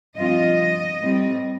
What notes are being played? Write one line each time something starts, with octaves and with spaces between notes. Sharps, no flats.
G2 F3 C4 F4 D#5
A2 G3 C4